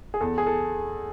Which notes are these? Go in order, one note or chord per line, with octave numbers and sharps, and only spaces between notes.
G#4
E2 A4
G#4
A4